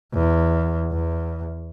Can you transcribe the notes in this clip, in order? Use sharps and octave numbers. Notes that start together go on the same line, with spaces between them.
E2
E2